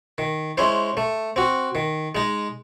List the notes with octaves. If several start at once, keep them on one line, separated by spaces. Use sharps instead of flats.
D#3
G#3 C#4 E4 C5
A3
C4 F#4
D#3
G#3 D#4